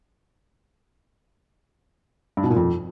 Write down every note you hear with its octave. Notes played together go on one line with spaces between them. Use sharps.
G2
B2
A#2
F2